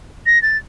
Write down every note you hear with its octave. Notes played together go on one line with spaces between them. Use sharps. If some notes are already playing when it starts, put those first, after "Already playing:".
A#6
A6